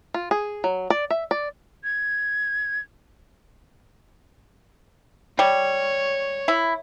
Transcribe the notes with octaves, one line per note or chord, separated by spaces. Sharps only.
F4
G#4
F#3
D5
E5
D5
G#6
G3 C#5
E4